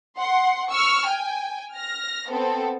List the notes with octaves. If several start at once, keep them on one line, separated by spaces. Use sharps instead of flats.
F#5 C6
C#6 E6 F6
G5 G#5
F6 A#6
B3 C4 A4